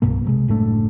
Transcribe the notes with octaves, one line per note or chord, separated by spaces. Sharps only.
C2 G2 B2 A#3
C3 F3 G#3
F#1 A2 A3 D4